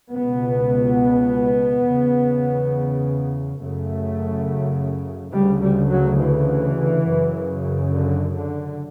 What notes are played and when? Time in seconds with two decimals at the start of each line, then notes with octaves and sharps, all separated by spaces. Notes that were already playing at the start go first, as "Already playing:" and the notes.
0.13 C#2 B2 B3
1.86 E2 C#3
3.58 F#2 C#3 A3
5.32 D2 C#3 G3
5.61 G3
5.90 F#3
6.18 E3
7.04 F#2 C#3
7.90 D3
8.34 D3